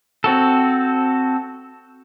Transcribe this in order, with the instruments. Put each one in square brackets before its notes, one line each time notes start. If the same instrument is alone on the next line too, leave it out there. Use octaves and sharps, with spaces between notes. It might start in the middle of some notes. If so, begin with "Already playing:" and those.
[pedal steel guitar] C4 F#4 A4